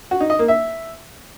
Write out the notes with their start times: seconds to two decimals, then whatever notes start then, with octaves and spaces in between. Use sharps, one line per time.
0.11 F#4
0.20 D#4
0.30 D#5
0.39 A#3
0.48 E5